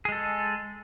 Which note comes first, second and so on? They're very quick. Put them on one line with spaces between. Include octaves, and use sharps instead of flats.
G#4 G#3 A4